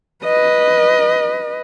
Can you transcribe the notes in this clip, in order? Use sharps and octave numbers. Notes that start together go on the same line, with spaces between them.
B4 D#5